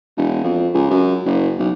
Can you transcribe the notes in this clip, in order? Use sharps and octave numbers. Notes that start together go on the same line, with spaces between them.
E1
F2
C#2
F#2
F#1
B1